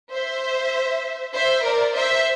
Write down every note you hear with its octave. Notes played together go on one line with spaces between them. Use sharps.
C5 E5
C5 E5
A#4 D5
C5 E5